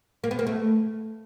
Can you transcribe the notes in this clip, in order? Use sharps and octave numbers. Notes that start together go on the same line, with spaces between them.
A#3
B3
A#3
A3